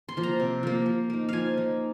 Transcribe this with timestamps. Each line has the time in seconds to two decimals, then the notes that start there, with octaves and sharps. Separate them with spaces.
0.09 C6
0.17 F3 A#3
0.23 A#5
0.40 C3
0.63 F3 A#3
0.86 F3
1.10 A#3 D#4
1.29 F3 F5 G#5
1.57 A#3 D#4